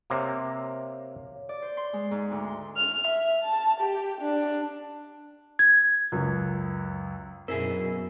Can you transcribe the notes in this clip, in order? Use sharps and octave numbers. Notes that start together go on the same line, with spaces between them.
C3 A#3 C#5 F5
D5
C5
C6
G#3
G#2
D2
C6
F6
E5
A5
G4
D4
G#6
C#2 F#2
F#2 B2 C4 E4 G#4 A#4